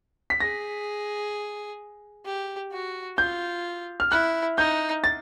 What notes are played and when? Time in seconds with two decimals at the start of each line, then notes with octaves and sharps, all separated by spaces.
0.30 B6
0.40 G#4 A#6
2.25 G4
2.72 F#4
3.18 F4 G6
4.00 F6
4.11 E4 F#6
4.58 D#4 G6
5.04 A6